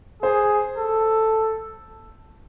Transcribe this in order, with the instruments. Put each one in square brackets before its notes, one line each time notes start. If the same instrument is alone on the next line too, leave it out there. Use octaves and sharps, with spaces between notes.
[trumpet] G#4 [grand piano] C5
[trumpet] A4